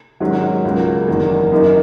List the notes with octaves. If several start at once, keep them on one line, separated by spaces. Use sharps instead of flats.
G#1 G#2 D#3 F#3 C#4
C#2 C#3 F#3 A#3
F#1 E2 D#3 A#3
F#2 D#3 A#3 D#4